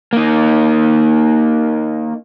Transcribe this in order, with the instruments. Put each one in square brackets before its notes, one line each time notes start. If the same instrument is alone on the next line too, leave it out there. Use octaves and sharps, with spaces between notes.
[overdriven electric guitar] A#3 D#4